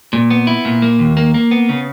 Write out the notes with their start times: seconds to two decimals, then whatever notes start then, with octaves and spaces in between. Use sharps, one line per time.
0.13 A#2
0.30 B3
0.47 E4
0.65 A#2
0.82 A#3
0.99 D#2
1.17 A#3
1.34 A#3
1.51 B3
1.69 C#3